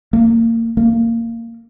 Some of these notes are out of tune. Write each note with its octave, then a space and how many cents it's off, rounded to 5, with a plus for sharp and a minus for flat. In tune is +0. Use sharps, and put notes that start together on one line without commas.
A#3 -30
A#3 -20